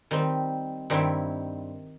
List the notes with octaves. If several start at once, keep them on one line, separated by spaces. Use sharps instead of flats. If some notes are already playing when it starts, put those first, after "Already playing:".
D#3 G3 C4
G2 D#3 G3 C4 E4